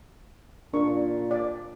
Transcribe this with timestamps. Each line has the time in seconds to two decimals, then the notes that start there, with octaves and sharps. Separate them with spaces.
0.73 A#2 D4 A#4 C#6
1.31 D5